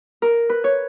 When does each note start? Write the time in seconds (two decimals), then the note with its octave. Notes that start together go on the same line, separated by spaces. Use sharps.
0.22 A#4
0.49 B4
0.64 C#5